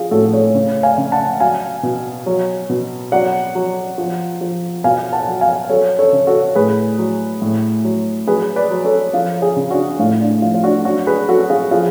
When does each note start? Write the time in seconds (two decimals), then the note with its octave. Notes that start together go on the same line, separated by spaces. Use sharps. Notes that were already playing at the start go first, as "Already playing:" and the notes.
Already playing: F3 F4 G#4
0.11 A2 F#4 A4
0.33 A4 C#5
0.55 C#3
0.83 F5 G#5
0.98 C#3
1.12 F#5 A5
1.40 F#3 F5 G#5
1.83 B2
2.26 F#3
2.69 B2
3.12 F#3 D5 F#5
3.55 F#3
3.98 F3
4.41 F3
4.84 B2 F5 G#5
5.12 F#5 A5
5.27 F#3
5.41 F5 G#5
5.69 F#3 A4 C#5
5.99 A4 C#5
6.13 C#3
6.27 F#4 A4
6.55 A2 G#4 B4
6.98 F#3
7.42 A2
7.85 F#3
8.27 F#3 G#4 B4
8.56 B4 D5
8.71 F#3
8.85 A4 C#5
9.13 F3 F4
9.42 F4 G#4
9.56 C#3
9.71 D4 F#4
9.99 A2 F4
10.21 D4
10.42 F3 F4
10.54 F4
10.64 D4 F#4
10.85 F#3 D4 F#4
11.07 G#4 B4
11.28 F#3 F#4 A4
11.50 F4 G#4
11.71 F3 F4 G#4